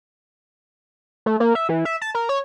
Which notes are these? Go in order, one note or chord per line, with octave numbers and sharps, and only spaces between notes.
A3
A#3
E5
E3
E5
A5
A#4
C#5